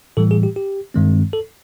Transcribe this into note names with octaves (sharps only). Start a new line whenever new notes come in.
A2 E3 G3 A4
G#4
G4
G4
G2 D#3 G#3 C4
A4